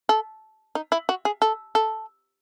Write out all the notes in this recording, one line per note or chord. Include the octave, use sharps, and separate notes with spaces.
A4
D#4
E4
F#4
G#4
A4
A4